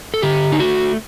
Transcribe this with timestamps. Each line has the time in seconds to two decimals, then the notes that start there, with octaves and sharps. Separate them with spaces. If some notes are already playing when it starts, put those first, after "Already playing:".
0.14 A4
0.22 D3 G4
0.52 D#4
0.59 A3 F#4